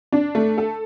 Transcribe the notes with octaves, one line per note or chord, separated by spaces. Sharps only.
D4
A3
A4